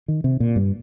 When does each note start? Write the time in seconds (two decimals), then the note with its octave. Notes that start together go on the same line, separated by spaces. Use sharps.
0.08 D#3
0.24 C3
0.40 A#2
0.56 G2